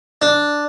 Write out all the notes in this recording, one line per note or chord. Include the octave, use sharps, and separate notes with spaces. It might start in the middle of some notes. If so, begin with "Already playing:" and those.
D4